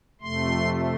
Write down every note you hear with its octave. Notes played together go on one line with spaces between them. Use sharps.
F2 C3 A3 C6